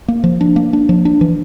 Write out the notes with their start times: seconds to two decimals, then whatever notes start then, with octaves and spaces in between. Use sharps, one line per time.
0.08 A#3
0.24 F3
0.41 D4
0.56 A#3
0.73 D4
0.89 F3
1.05 D4
1.21 E3